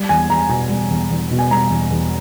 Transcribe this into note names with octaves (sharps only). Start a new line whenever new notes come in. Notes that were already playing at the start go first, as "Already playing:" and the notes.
Already playing: G3
E2 G#5
E2 A#5
B2 G#5
G3
E2
E2
B2
G#5
G3 A#5
E2
E2